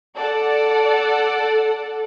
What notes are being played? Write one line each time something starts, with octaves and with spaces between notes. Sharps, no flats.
A4 D5 F#5